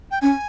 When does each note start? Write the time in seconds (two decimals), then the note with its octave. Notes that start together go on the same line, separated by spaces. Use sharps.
0.11 G5
0.22 C#4 G#5